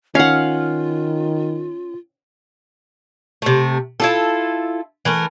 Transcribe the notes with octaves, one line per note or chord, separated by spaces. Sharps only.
D#3 C#4 F4 F5 F#5
C3 A3
E4 F4 A4
E3 A3 A#4